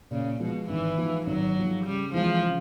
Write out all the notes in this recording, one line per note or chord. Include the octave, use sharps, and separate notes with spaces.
A#2 C#3
B2 F3 G#3
G#1 E3
G#2 F3
G#1 F#3
G#2 F3
C#3 G3
E3 F3 G#3 C4
C#3